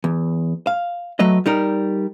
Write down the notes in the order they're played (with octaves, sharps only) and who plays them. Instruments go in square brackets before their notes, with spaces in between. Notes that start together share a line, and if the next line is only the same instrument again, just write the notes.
[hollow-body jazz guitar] E2
F5
F#3 A3 B4 D#5
G3 D#4 A#4